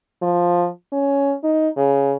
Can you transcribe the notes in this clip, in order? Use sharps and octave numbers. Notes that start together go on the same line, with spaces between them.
F3
C#4
D#4
C#3